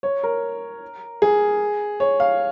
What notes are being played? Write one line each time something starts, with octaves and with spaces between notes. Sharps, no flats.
C#5
A#4
G#4
C#5
F5